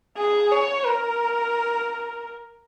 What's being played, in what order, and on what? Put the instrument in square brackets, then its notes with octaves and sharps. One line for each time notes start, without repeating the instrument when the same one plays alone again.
[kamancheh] G#4
C#5
A#4